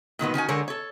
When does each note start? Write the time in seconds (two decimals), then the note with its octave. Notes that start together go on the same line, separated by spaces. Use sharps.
0.19 A#2 D#3 F#3 B3
0.34 D#3 C#4 F#4 G#5
0.49 D3 G#3 G#4 A#4 C#5
0.68 A4 C#5